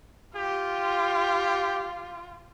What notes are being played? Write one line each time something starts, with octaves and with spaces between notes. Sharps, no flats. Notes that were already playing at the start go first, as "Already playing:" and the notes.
F4 G4